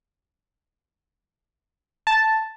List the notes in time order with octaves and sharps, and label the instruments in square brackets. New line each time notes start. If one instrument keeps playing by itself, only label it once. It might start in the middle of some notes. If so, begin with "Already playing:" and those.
[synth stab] A5